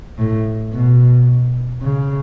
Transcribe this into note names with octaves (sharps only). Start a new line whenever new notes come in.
A2
B2
C#3